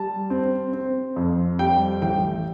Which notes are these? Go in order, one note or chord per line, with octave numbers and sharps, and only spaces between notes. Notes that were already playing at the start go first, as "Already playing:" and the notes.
Already playing: G3 A5
C4
C4
F2
G3 G5
A1 G5